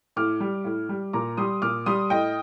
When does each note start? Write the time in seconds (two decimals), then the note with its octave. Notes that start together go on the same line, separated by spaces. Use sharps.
0.16 A2 D6 F6
0.40 G3
0.65 A2
0.89 G3
1.13 A#2 A#5 D6
1.37 G3 C6 D#6
1.62 A#2 D6 F6
1.86 G3 C6 D#6
2.10 A2 D#5 G5